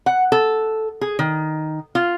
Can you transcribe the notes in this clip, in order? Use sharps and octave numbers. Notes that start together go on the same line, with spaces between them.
F#5
A4
G#4
D#3
F4